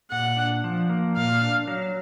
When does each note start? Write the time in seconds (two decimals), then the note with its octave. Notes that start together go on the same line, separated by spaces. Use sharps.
0.11 A#2 F#5
0.37 D4
0.64 F3
0.89 A#3
1.16 A#2 F5
1.42 D4
1.68 F#3